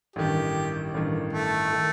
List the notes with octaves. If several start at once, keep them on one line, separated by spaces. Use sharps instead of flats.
A1 G2 D#3 G4
A1 G2 D#3
A3
D#3